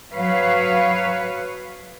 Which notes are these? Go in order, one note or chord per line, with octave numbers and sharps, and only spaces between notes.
F#3 B4 C#5 F5